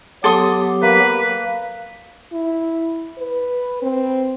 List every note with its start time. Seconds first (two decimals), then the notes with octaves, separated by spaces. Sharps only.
0.24 F#3 B3 G4 A4 C6 D#6
0.83 A#3 B4
2.32 E4
3.18 B4
3.82 C4